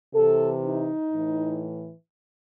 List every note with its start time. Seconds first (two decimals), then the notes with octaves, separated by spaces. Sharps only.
0.14 C3 E3 A4
0.65 D#4
1.13 A2 E3